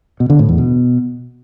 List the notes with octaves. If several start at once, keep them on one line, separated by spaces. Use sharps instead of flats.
B2
D3
A2
E2
B2